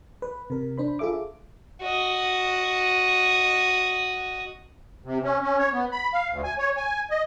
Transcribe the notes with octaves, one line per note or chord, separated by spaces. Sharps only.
B4
C3 A#4
D4 C5 B5
F4 G#4 A4 E5 D6
F#4 D#5
C3
C#4
C#4
C#5
B3
B5
F5
D2
G#5
C#5
G#5
D#5